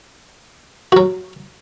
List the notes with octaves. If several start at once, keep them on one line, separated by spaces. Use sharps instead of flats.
F#3 F#4